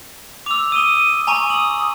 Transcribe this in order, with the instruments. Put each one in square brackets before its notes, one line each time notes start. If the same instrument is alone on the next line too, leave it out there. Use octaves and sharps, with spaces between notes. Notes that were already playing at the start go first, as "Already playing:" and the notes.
[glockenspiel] D6 E6 [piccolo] F7
[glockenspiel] D#6 G7 [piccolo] D#7
[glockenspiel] G#5 A#5 C#6
[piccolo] D#6 [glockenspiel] D#7 F#7